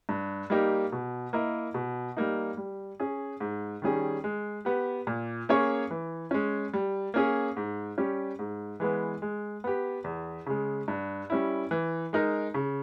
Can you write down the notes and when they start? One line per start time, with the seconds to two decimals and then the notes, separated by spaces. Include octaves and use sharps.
0.09 G2
0.50 G3 A#3 D#4 G4
0.92 B2
1.33 A#3 E4 A#4 D#5
1.74 B2
2.17 G3 A#3 D#4
2.57 G3
3.00 C#4 G#4
3.40 G#2
3.82 D#3 G3 C#4 G#4
4.24 G#3
4.65 B3 G4
5.07 A#2
5.49 A#3 C#4 G#4 C#5
5.91 E3
6.31 G#3 C#4
6.74 G3
7.14 A#3 C#4 G#4
7.57 G#2
7.98 G3 C#4 G4
8.39 G#2
8.80 E3 G#3 B3
9.22 G#3
9.64 B3 G4
10.04 E2
10.46 C#3 G#3
10.88 G2
11.30 G3 C#4 E4
11.71 E3
12.13 G#3 D#4 A#4
12.54 C#3